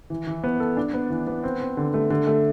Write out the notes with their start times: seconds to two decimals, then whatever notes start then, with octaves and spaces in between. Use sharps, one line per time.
0.10 E3
0.27 E3
0.44 B3
0.60 A4
0.77 D4
0.94 B3
1.10 E3
1.27 B3
1.44 C4
1.60 C4
1.77 D3
1.94 A3
2.10 D3
2.27 A3